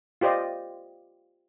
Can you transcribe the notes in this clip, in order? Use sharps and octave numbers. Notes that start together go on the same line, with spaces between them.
F4 G4 C5 D5 D#5